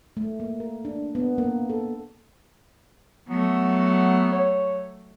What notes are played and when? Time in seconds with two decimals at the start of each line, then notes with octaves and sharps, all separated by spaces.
0.17 A3
0.40 A#3
0.60 A#4
0.85 D4
1.15 B3
1.38 A#3
1.70 A4
3.29 F#3 A3 B3
4.32 C#5